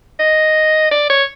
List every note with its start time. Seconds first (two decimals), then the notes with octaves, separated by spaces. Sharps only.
0.20 D#5
0.92 D5
1.10 C#5